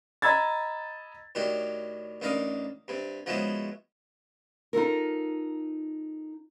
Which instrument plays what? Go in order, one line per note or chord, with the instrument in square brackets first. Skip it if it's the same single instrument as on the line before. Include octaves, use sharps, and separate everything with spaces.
[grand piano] D#5 A#5 B5 E6 G#6 A6
[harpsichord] A2 D#3 F#3 D4 G4
A1 D4 D#4 A#4 F5 D#6
G2 C3
F3 F#3 G#3 B3 C#4 E4
[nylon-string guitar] D#4 F4 A4 A#4